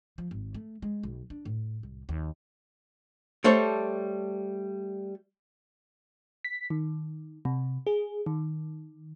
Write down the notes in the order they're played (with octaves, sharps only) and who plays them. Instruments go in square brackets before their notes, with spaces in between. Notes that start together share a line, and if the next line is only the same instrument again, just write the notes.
[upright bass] F3
G#1
A3
G#3
B1
D4
A2
C2
D#2
[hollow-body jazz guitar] G3 A3 A4 C5 C#5
[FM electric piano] B6
D#3
C3
G#4
D#3